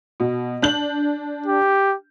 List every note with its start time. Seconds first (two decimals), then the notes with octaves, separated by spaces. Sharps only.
0.20 B2
0.62 D4 G6 F#7
1.46 G4